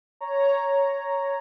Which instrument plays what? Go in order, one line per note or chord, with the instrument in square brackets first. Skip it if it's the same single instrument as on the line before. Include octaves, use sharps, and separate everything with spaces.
[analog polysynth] C#5 A#5